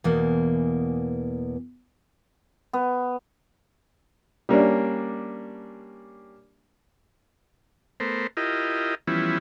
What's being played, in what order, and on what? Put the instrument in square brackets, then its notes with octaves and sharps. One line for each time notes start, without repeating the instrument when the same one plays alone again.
[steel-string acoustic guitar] E2 B2 E3 A#3
[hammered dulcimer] B3
[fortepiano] G3 A#3 C#4 D4
[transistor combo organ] A3 B3 A#4 C5
E4 F4 G4 A#4 D#5
E3 F3 G3 B3 C#4 E4